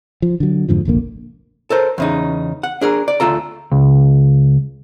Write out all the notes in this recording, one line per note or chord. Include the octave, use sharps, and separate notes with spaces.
F3
D3 F#3
F2 G#2 D3 F3
F1 A#1 D3 A#3
A4 A#4 C5
E2 C#3 D#4
F#5
D4 G#4 A#4
D5
D2 F4 A4 A#5
C#2